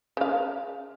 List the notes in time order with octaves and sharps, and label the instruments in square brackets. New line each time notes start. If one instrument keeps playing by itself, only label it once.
[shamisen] C#3 F5